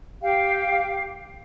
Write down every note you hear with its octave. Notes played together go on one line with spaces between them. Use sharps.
G4 F5 G5